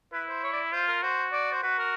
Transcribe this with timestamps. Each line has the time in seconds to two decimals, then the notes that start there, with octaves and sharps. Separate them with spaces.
0.13 E4 B4
0.29 C5
0.43 C#5
0.53 D5
0.73 F4 C5
0.88 A#4
1.02 F#4 C5
1.32 D5
1.52 C5
1.63 F#4 B4
1.78 A#4